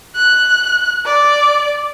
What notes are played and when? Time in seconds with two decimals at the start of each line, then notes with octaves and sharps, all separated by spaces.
0.16 F#6
1.06 D5